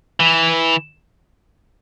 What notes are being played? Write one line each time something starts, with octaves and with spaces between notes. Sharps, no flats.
E3